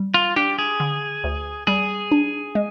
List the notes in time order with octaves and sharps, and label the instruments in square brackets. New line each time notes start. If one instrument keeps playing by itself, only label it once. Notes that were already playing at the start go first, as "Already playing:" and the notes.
Already playing: [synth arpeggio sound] G3
[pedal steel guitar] F4
[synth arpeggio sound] D4 [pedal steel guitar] G4
[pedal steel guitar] G#4
[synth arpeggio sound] D3
D2
[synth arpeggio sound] G3 [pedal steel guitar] G#4
[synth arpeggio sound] D4
G#3